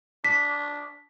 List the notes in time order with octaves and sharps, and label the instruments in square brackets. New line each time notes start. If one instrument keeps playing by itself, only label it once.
[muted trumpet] D4 [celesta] B6